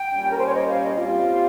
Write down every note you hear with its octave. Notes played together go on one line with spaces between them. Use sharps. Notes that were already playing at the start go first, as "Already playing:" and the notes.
Already playing: G5
A#2 G3 C#4
A#4
C5
C#5
D#5
F5
D#5
A#2 G3 C4 F4 G4